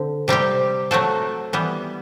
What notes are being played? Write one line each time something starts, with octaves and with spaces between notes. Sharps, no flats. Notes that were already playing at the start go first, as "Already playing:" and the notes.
Already playing: D3 C4
C3 G3 C4 G4
F#3 A3 C4 F#4 A4
E3 G3 B3